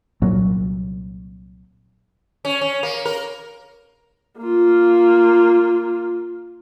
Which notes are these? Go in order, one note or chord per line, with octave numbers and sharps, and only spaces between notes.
C2 A#2 F#3 A#3
C#4
C#4
A#3
A#4
A#3 F4